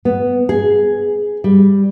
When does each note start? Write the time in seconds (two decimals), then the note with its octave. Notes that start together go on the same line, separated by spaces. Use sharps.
0.05 B3
0.49 G#4
1.44 G3